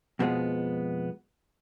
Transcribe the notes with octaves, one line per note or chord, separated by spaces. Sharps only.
F2 B2 F3 G3 G#3 B3